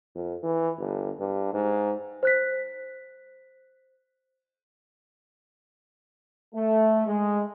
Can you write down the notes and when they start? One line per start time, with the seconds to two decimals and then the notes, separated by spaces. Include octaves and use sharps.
0.15 F2
0.43 E3
0.78 G1
1.19 G2
1.53 G#2
2.23 C5 F#6 B6
6.55 A3
7.06 G#3